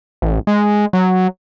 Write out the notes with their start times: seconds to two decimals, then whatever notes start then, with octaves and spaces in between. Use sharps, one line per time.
0.22 A1
0.47 G#3
0.93 F#3